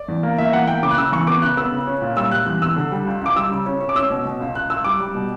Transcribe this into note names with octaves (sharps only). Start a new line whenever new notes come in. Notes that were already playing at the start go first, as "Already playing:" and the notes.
Already playing: D5
E2
A#3
A#3 E5
E2 F#5
A#3 G5
C#3 D6
F#6
C#3 E6
E2 C#6
B3 D6
C#3 F#6
B3 E6
C#3
C#4
A#2
G3 E6
G3 F#6
E2 F#6
E2 E6
D3
G3
C#2
C#2 D6
G3 E6
C#3
C#4
C#4
D6
C#4 E6
B2
B2
C#2
C#2 F#6
C#2 E6
G3 D6
G3
B2